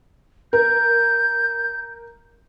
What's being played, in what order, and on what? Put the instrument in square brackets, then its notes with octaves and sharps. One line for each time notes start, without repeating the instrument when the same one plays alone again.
[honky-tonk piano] A#4 [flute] G6